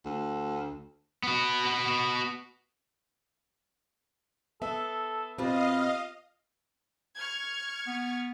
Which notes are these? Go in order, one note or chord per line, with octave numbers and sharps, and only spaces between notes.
D2
B3 F#4
B3 A4 E5
B2 C4 F4 G4 B4 D#5 F5
C#6 F6 G#6
B3